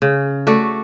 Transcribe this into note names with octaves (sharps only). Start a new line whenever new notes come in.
C#3
A3 F#4 D5